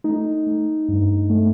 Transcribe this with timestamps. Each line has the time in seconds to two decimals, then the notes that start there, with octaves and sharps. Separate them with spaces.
0.04 A3 D#4
0.47 A3
0.89 G2
1.30 A3